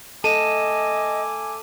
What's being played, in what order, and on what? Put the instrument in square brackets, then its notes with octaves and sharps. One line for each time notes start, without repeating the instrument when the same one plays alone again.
[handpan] A4 [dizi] D#5 [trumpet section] E5 G#5 D6 [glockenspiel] A5 D#7 E7